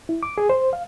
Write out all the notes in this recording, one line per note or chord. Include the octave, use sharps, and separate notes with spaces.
E4
D6
G#4
C5
F5